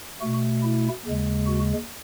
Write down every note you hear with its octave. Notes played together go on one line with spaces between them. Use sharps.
B2 A3 F#4
E4
D#2 C#3 G#3
F#4